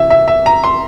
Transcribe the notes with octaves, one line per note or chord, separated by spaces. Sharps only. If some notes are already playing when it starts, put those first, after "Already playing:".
Already playing: C3 E3 E5
E5
E5
A#5
C6